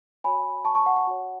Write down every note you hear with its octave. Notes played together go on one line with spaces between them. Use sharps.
F#4 C#5 G#5 B5
A5 C#6
A5 C#6
F#5
F#5
F#4 C#5